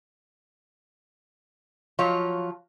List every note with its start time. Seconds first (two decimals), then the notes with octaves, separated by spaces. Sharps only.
1.99 F3 F#3 F4 C#5